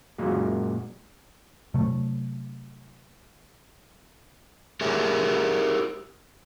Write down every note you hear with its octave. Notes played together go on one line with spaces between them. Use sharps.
F#2 A#2 G#3 A#3 F#4
C3 F#3 A3
G4 G#4 A#4 C#5 E5 G#5